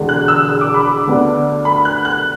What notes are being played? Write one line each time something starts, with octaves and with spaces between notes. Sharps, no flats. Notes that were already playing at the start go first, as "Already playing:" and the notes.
Already playing: E1 E2 D3
F#6
E6
E6
D6
B5
D6
D2 D3 B3 D4
B5
F#6
F#6